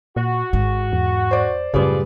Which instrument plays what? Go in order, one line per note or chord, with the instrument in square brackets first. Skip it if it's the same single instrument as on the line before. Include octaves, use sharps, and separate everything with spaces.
[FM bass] A#2 [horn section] F#4
[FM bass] G#1 [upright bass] G#2
[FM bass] E2
[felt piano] C5 D5
[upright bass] F#2 A2 [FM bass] C#3 [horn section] F3 D5 [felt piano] G3 G#4 B4